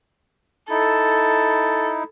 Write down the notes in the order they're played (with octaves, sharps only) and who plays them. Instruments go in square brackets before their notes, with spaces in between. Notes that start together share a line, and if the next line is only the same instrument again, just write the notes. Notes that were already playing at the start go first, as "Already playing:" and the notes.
[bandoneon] D#4 E4 [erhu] A4